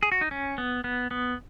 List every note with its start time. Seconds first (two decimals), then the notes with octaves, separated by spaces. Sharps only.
0.03 G#4
0.12 F#4
0.21 D#4
0.31 C#4
0.58 B3
0.84 B3
1.11 B3